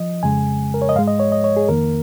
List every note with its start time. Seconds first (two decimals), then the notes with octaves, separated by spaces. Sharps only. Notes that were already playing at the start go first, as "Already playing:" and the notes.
Already playing: F3 D#5
0.23 F2 C#3 G#3 G#5
0.74 A#4
0.82 C#5
0.89 D#5
0.96 G#2 F5
0.99 G#3
1.07 D#5
1.20 C#5
1.32 D#5
1.44 C#5
1.57 G#4
1.68 F2 D#3 A#3 A#4